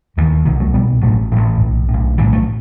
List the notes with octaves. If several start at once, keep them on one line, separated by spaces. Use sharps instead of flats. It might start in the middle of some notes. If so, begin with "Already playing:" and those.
E1 D#2 E3
C2 B2 D#3
F#3 A3
C2 B2 G3 B3
A1 A2 F#3 A3
A1 A2 E3 G3
E3
B1 A2
B1 A2
B1 A2 E3 G3
F#3 A3